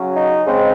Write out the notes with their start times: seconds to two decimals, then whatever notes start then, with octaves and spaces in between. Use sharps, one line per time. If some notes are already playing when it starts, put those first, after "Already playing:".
Already playing: C#3 F#3 C#4
0.15 D#4
0.45 C#3 G#3 C4